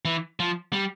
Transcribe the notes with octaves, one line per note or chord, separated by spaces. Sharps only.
E3
F3
G3